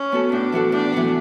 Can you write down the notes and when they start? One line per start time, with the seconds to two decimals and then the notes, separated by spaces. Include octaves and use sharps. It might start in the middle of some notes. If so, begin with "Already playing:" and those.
Already playing: C#4
0.12 B3 F#4 A4
0.32 A2 D4
0.52 E3 B3 F#4 A4
0.72 A2 D4
0.93 E3 B3 F#4 A4